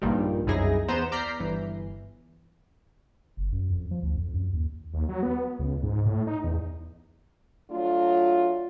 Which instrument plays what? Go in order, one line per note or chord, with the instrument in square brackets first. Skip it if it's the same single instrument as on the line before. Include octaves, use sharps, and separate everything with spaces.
[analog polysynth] A#1 G2 A#2 D#3 G3
C2 F#2 D#4 E4 G#4 A#6
E2 B3 C5 A#5 G6 E7
D5 A#5 F6 G6 B6 C7
G1 E3
[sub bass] F#1
F#2
F2
F3
D2
F2
F#2
D#2
[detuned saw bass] D#2
F#3
B3
C#2
G#2
A2
D#4
E2
[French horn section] F#3 A3 D4 F4